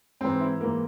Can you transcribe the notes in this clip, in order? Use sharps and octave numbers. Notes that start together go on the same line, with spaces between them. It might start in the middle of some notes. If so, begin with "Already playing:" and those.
G#2 E3 C4
E4
G#2 E3 A#3